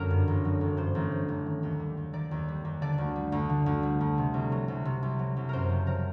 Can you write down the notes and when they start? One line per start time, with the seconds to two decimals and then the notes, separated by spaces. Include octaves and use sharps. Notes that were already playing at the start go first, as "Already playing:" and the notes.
Already playing: F#2 D3 G3 A#4
0.11 G2
0.28 A1
0.45 F#3
0.61 A1
0.77 G2 C5
0.95 A1
1.11 F#3
1.28 A1
1.46 D#3
1.63 D#2
1.80 G3
1.97 D#2
2.13 D#3 D5
2.31 D#2
2.48 G3
2.65 D#2
2.82 D3 D5
2.98 D2
3.16 G3
3.32 D2
3.49 D3
3.66 D2
3.83 G3
4.01 D2
4.18 C3
4.34 C2
4.52 F#3
4.68 C2
4.85 C3
5.03 C2
5.19 F#3
5.37 C2
5.49 F#2 A#4 C5
5.70 F#1
5.87 F#3 A#4